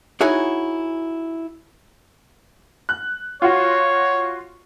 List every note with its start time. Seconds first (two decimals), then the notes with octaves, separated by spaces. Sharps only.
0.21 D#4 E4 F#4 G#4 C#5
2.89 F#6
3.42 F4 F#4 C#5